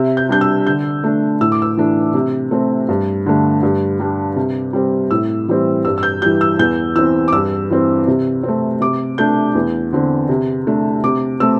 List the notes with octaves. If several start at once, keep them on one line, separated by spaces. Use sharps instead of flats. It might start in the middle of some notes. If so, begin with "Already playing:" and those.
Already playing: C3 E5
G6
G3 D4 G6
E6
D3 G6
A3 D4
A2 E6
D6
E6
E3 A3 D4
C3
A3 C4
G2
D3 A3
G2
G3 D4
C3
G3 C4
A2 E6
E3 G3 C4
G2 E6
E6
G6
E3 G3 G6
E6
E2 G6
E3 C4 E6
D6
G2 E6
E3 C4
C3
A3 C4
C3 D6
A3 D4 G6
E2
D3 C4
C3
A3 D4
C3 D6
A3 C4 E6